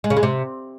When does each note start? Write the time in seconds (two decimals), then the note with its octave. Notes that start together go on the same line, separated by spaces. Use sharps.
0.04 G#3
0.10 C#3
0.17 G#3
0.23 C3